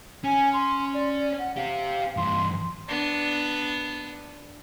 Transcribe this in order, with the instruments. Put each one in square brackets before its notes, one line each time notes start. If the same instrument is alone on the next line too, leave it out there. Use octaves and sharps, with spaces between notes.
[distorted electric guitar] C#4 [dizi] G#5
[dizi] C6
D5
F#5
[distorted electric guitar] C4 G4 [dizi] F5
[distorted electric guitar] G2 E3 [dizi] C6
[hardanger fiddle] B3 D4